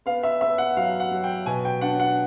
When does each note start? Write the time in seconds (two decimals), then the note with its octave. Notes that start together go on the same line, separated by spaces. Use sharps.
0.06 B3 F5
0.23 E5
0.41 B3 E5
0.58 F#5
0.77 F#3 F5
1.00 F#5
1.11 F#3
1.24 G5
1.46 B2 G#5
1.65 G5
1.81 D4 F#5
2.00 F#5